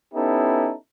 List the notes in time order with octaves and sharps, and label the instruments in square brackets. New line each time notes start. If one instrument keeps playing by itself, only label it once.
[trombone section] B3 C#4 D#4 E4 G4 A4